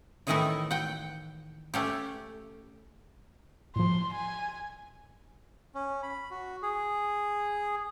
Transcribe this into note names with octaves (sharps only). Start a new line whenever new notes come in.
A2 D#3 E3 A3 D#4 E4
F#5 G5
A3 C#4 G4
A2 F3 C6
G#5
C#4
B5
F#4
G#4